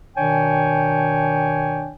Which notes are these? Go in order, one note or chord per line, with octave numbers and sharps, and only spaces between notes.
B2 D#3 D4 C#5 G5 G#5